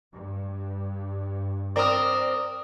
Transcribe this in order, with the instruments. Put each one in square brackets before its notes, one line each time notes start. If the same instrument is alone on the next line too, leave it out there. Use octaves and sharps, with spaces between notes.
[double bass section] G2
[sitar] C4 A#4 [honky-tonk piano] D5 D#6